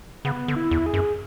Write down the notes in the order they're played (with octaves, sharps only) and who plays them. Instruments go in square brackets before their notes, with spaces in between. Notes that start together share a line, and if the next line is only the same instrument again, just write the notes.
[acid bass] C#3 [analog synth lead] B3
[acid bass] D3
[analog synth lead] E4
[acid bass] E2
[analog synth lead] G#4
[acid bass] F#2